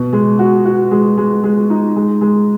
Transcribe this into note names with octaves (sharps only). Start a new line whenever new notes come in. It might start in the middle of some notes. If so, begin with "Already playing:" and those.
Already playing: B2
G#3
F#4
F#4
G#3
G#3
G#3
D#4
G#3
G#3